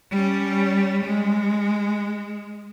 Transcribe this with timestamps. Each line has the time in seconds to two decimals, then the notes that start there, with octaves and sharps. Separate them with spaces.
0.11 G3 C#4
1.04 G#3